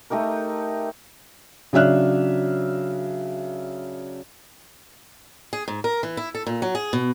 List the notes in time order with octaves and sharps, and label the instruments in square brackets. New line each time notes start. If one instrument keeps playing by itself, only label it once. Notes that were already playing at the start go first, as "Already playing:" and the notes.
[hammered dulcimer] A3 D#4 G4 A#4
[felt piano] C#3 F#3 D4 E5 F6 F#6
[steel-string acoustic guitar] G#4
G#2
A#4
E3
E4
A4
A#2
F#3
G#4
B2